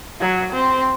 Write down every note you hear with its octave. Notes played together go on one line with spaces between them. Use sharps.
F#3
C4